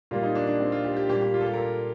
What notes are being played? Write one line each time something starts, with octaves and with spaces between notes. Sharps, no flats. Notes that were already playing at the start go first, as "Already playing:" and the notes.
A#2 G3 A#3 F4
D#4
D4
D4
C4
F4
G4
G4
A#2 G3 A#3 G4
G4
F4
A4
G4
A#4
A4